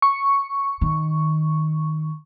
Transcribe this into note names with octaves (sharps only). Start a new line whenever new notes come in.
C#6
D#3